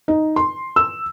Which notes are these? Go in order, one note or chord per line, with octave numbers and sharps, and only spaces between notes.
D#4
C6
E6